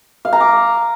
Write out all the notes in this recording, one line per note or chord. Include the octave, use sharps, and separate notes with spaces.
F5
A#5
D6